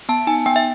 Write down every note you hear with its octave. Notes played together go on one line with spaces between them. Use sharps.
B3 A5
D#4 G#5
B3 G5
E5